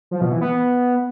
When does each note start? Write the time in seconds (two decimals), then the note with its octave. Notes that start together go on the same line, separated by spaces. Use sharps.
0.11 F3
0.21 B2
0.31 E3
0.41 B3